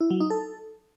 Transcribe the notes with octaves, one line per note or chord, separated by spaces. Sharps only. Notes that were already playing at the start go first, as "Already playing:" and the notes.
E4
F#3
D#4
A4